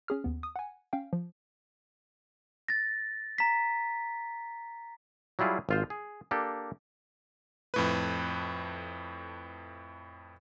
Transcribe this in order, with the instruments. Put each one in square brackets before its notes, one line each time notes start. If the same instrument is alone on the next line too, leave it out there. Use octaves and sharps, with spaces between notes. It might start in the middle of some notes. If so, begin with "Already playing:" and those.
[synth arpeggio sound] C#4 G#4 F6
D#2 B3
D#6
F#5 G#5
C#4 F5 G5
F3
[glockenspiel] A6 A#6
A#5 B6
[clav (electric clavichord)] F#3 G3 E4 F4 G#4
G#1 F4 C5
G#4
A#3 D4 G4 A4
[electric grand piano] F2 A2 B4